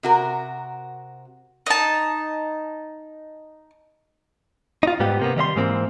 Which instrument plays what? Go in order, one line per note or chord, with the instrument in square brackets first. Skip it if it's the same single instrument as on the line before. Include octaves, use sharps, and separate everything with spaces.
[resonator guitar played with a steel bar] C3 F#4 A#4
[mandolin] D#4 A5
[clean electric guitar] D#4 F4
G#2 G3 B3 G4
C3 A#3 B3
D#3 G3 D#5 C6
G#2 E3 A#3 C4